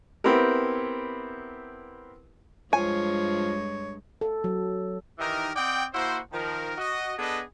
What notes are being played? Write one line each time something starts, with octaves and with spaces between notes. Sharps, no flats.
B3 C4 E4 G4 A#4
G2 F3 G#3 C#5 G#5
A4
F#3
D#3 E3 D#4 G4 A#4
C4 D5 D#5 F#5 G5
A#3 E4 F#4 C5
D#3 F3 A#4
F#4 D#5
B3 D4 G#4 A4 B4 D#5